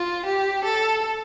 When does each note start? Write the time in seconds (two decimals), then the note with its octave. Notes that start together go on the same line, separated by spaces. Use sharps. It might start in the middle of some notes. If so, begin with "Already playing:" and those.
Already playing: F4
0.25 G4
0.64 A4